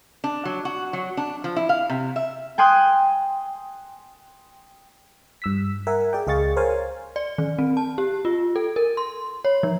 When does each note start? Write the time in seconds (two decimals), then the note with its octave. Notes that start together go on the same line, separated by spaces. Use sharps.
0.24 D4
0.45 F#3
0.65 F#4
0.93 F#3
1.17 D4
1.44 F3
1.56 E4
1.69 F5
1.90 C3
2.16 E5
2.58 G5 G#5 C6 D#6 F#6
5.42 G2 E6 B6
5.87 A#4 E5 F#5 G#5
6.13 G#4 D5 G5
6.27 C#2 G#4 D#5 F5 C#6 A6
6.56 A#4 C5 C#5 F5 G#5
7.16 D5
7.38 D#3
7.59 C4
7.77 A5
7.98 G4
8.25 F4
8.56 A4
8.76 A#4
8.97 C6
9.45 C#5
9.63 F3